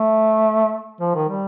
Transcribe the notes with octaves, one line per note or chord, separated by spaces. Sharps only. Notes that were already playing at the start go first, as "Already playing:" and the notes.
Already playing: A3
F3
D#3
G3